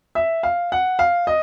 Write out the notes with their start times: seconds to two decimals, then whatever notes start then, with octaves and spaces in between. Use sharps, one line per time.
0.15 E5
0.43 F5
0.72 F#5
0.99 F5
1.27 D#5